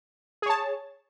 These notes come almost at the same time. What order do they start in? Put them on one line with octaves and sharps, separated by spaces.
G#4 C#5 A5